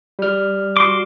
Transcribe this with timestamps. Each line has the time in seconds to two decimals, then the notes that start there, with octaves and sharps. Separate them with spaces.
0.19 G3 F6
0.77 F#4 C6 D6